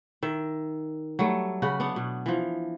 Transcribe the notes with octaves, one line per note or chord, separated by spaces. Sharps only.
D#3 E5
F#3 G3 A3
C#3 F#4 B4
B3 D4 F#5
B2
E3 F3